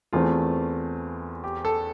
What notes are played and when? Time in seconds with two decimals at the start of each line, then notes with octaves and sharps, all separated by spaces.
0.13 E2 E3 A3 C4 F4
1.44 G4
1.65 A4